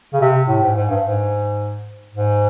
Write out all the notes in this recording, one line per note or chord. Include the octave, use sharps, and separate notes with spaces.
C#3
C3
A2
G#2
G#2
G2
G#2
G#2